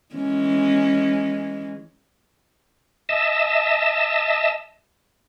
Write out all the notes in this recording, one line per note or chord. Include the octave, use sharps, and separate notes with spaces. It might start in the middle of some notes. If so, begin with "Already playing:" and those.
E3 G#3 C#4
D#5 E5 A5